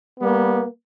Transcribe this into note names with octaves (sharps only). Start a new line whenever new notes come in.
G3 A#3 B3